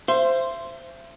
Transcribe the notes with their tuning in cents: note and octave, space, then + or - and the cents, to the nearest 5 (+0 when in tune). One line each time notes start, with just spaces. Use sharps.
C5 +0 E5 +35